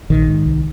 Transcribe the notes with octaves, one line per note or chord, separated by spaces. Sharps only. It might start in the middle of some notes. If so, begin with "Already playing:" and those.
A#1 D#3
G#2
C2